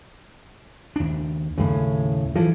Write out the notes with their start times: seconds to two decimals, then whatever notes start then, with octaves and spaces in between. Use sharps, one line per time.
0.96 D#2 D4
1.58 D#2 A2 C#3
2.35 E3 F3 F4 A4